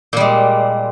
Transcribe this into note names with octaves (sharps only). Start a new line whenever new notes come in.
A#2 G3 G#3